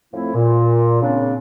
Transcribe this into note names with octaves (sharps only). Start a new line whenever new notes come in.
F2 A2 F3 A3 C4 E4
A#2
C#3 A#3 C4 D4